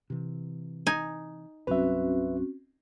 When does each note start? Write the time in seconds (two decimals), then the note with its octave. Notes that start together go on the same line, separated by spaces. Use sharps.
0.10 C3 E3
0.87 D#4 G#5
1.67 C2 G2 F#3 C4 C#4 F#4 B4 E5